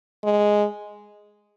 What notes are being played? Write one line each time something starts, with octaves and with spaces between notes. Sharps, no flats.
G#3